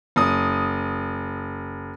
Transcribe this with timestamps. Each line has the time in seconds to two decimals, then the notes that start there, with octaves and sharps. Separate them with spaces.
0.16 F#1 D#6